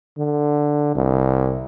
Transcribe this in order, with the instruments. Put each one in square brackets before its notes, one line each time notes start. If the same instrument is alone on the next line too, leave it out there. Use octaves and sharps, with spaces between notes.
[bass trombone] D3
C2